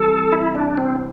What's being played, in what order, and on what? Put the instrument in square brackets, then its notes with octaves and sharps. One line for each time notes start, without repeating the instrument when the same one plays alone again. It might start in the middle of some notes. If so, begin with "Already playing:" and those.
Already playing: [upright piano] C3 E3 G3 [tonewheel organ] A4
[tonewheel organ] E4
D4
C4